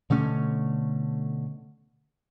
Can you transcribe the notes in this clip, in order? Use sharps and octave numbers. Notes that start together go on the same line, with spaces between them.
B2 D3 A3 C#4